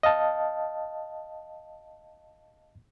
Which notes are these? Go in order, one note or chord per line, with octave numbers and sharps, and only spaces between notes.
D#5 F5 A5